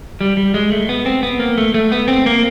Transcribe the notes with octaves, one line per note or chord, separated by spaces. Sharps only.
G3
G3
G#3
A3
B3
C4
B3
A#3
A3
A3
B3
C4
A#3